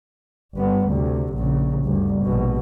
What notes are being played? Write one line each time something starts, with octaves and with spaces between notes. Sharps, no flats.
G1 B3
D2 C3
A#1 C#3
G1 D2
A#1 B2